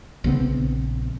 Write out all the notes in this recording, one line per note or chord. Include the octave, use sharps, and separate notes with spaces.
A#1 C#3 B3 C4